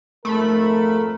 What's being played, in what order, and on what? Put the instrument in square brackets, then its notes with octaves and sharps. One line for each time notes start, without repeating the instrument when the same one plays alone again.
[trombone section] F2 G#2 A#4 [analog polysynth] A3 B5